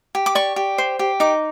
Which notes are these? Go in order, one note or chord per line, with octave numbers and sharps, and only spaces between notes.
G4
D6
D5 C#6
G4
C5
G4
D#4 D6